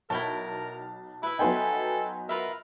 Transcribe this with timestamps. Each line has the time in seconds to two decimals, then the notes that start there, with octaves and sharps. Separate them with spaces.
0.10 B1 E4 A#4 G5 A5 C#6
1.23 E4 B4 E5
1.39 F#3 B3 D#4 A4 G5 G#5 C6
2.29 F4 A#4 B4 E5